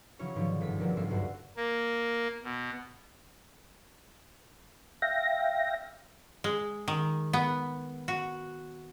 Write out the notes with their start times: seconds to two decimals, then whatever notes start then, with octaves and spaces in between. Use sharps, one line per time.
0.19 C#3 E3 F#3 C#4 C#5
0.35 G#2 B2 D3 D#3 F3
0.61 G1 C3 B6
0.79 A#2 D3 F3 F#3 A#3 C4
0.97 B1 G#2 C3 E5 C7
1.10 C#2 G2 D3 F#4
1.56 A#3
2.43 B2
5.02 E5 F5 G5 A#6
6.44 G#3
6.88 D#3
7.33 B3
8.08 F#4